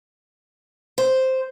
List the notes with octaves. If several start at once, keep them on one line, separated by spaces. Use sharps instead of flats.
C5